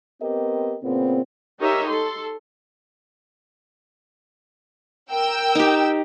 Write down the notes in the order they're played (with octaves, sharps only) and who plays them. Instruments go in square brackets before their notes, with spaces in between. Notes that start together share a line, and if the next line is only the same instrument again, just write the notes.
[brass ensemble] B3 C4 G4 A#4 D#5
A#2 C#3 B3 C4
[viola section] D#4 G4 A#4 C#5 D#5 E5
A4 C6
[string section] A#4 G5 E6
[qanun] D#4 G4